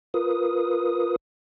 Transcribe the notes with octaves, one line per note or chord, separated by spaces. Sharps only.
F4 A#4 B4 D#6